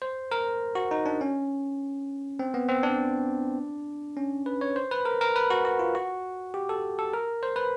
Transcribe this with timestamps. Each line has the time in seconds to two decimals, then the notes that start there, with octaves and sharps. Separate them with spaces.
0.02 C5
0.31 A#4
0.75 F#4
0.91 D#4
1.06 D4
1.21 C#4
2.39 C4
2.54 B3
2.68 C4
2.83 D4
4.17 C#4
4.46 B4
4.61 C#5
4.76 C5
4.91 B4
5.05 A#4
5.21 A#4
5.36 B4
5.50 F#4
5.65 F#4
5.79 F4
5.95 F#4
6.54 G4
6.69 A4
6.99 A4
7.13 A#4
7.43 C5
7.56 B4